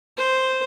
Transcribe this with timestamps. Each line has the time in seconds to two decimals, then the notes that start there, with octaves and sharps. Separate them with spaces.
0.17 C5